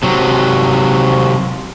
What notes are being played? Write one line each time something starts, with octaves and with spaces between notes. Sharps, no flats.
C3 F#3